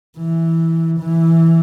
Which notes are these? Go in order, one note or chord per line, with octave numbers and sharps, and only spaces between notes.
E3
E3